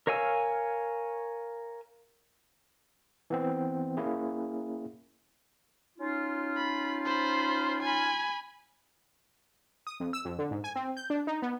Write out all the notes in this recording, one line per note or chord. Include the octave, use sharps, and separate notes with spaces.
A#4 C#5 F5 G#5 E6
E3 B3 C4
A#3 C#4 E4 G#4
C#4 D#4 F4
B5
C5 B5
G#5 B5
D#6
F2
E6
F2
D3
G#2
G#5
C4
G6
D4
D#4
B3